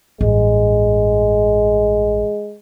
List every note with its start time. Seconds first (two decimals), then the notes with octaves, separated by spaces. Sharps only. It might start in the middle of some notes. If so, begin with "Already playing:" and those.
0.21 A1 G2 G#3